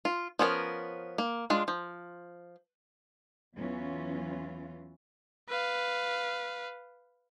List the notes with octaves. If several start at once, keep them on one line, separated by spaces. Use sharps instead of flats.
F4
F3 B3 C#4 A4 A#4
A#3
G#3 D4 F4
F3
E2 E3 F#3 B3 C#4 F4
B4 F5